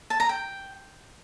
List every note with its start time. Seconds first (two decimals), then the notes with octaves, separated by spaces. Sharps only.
0.10 A5
0.20 A#5
0.29 G5